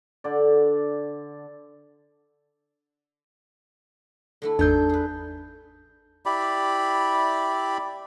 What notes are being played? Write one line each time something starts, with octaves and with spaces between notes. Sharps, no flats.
D3 D5
D3 A3 E4
G#1 E2 A3 D4 D#4 C6 G6
G#4 B4
E4 G4 D5 B5